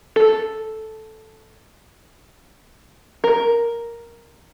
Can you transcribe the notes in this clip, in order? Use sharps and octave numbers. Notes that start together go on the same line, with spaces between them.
A4
A#4